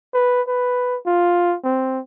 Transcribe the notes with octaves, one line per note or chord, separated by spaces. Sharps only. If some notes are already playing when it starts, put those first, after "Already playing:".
B4
B4
F4
C4